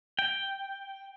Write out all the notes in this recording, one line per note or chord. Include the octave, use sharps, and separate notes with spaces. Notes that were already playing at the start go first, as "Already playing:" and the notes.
G5